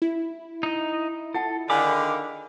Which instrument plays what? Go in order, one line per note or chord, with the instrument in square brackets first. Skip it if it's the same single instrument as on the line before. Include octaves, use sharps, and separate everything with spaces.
[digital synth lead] E4
[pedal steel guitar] D#4 D#5
[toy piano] F4 F#5 A5 [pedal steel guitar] A4
[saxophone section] D3 D#3 [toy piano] G#4 G#5 [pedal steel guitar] F5 B5 D6